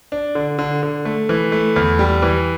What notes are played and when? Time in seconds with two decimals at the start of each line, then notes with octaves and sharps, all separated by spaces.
0.12 D4
0.35 D3
0.59 D3
0.83 D3
1.05 A3
1.29 E3
1.52 A3
1.76 E2
1.99 G3
2.23 E3